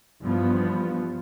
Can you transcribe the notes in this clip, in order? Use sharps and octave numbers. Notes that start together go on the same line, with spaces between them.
G2 E3 F3 B3